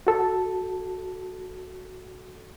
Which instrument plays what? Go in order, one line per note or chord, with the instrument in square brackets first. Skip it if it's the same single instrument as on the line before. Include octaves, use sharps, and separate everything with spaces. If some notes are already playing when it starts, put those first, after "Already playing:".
[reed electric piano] F#4 A4